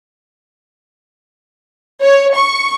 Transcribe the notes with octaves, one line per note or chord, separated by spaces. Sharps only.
C#5
C#6